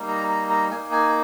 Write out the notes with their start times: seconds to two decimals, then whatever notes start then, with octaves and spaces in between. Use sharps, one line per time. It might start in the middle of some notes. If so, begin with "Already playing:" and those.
Already playing: G3 A#3 D#4
0.08 A#5
0.29 A#5
0.50 A#5
0.71 A#3 D#4 G#5
0.92 G#5